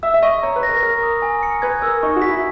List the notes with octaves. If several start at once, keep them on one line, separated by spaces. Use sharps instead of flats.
E5 E6
E5
D#5 C#6
C#5 A#5
B4
A#6
A#4
A#4 A#6
D#6
G#5
C#7
B4 G#6
A#4 E6
D#4 C#6
F#4
B6
E4